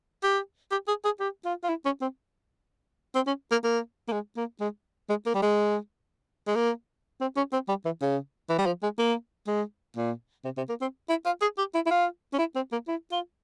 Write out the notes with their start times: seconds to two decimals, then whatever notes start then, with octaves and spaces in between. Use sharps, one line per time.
0.23 G4
0.71 G4
0.88 G#4
1.05 G#4
1.20 G4
1.45 F4
1.64 F4
1.69 E4
1.85 C#4
2.02 C4
3.15 C4
3.27 C#4
3.51 A#3
3.64 A#3
4.08 A#3
4.12 G#3
4.37 A#3
4.60 G#3
5.10 G#3
5.26 A#3
5.35 G3
5.42 G#3
6.47 G#3
6.56 A#3
7.21 C4
7.37 C#4
7.53 C4
7.69 G3
7.85 E3
8.02 C#3
8.50 E3
8.58 G3
8.66 F3
8.83 G#3
8.99 A#3
9.47 G#3
9.97 A#2
10.44 C3
10.57 C3
10.69 A#3
10.81 C4
11.09 E4
11.26 F4
11.42 G#4
11.58 G4
11.75 E4
11.86 E4
11.91 F4
12.34 C#4
12.39 E4
12.55 C4
12.72 A#3
12.88 E4
13.12 F4